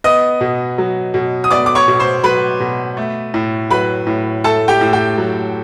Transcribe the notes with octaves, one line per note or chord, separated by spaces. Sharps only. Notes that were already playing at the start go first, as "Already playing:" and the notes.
B3 D#5 D#6
B2
F#3
B2
D#6
B3 D5 D6
D6
C#5 C#6
B2
C5 C6
F#3 B4 B5
B2
A3
A2
F#3 B4 B5
A2
A3 A4 A5
G4 G5
A2
G4 G5
F#3